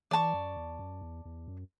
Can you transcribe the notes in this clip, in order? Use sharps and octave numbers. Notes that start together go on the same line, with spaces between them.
E3 D5 A5 C#6
F#2
E2
F#2
E2
E2
F#2